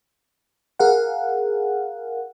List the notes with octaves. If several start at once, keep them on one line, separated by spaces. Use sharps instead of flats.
G#4 A#4 F5 F#5